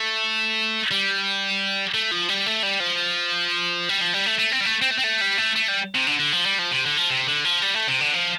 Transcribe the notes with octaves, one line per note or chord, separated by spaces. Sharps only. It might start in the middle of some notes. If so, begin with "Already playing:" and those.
Already playing: A3
G3
A3
F3
G3
A3
G3
F3
G3
F3
G3
A3
A3
C4
G3
A3
C4
A3
C4
A3
G3
A3
A3
G3
C3
D3
D3
F3
G3
F3
C3
D3
F3
C3
D3
F3
G3
A3
C3
D3
F3